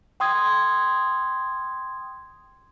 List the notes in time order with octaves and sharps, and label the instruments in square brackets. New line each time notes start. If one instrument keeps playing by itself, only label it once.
[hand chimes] G5 C6 D#6 G#6